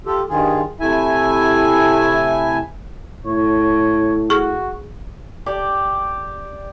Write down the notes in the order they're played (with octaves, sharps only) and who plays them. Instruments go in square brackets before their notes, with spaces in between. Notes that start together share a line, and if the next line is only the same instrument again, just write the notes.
[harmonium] F4 G4 A4
G2 D#3 F4 G#4
C3 A3 E4 E5 G#5
[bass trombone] A2 [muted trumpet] C#5
[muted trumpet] F#4 [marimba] G#4 C#6
[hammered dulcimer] G4 D5